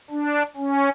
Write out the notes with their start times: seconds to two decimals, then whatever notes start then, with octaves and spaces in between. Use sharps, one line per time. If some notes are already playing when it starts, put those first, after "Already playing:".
0.10 D4
0.57 C#4